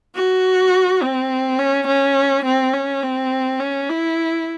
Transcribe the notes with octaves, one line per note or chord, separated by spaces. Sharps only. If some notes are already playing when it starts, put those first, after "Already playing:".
F#4
C4
C#4
C#4
C4
C#4
C4
C#4
E4